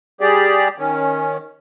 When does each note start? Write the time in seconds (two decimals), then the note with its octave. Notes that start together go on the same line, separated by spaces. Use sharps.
0.21 G3 G4 G#4 D5
0.78 D#3 C#4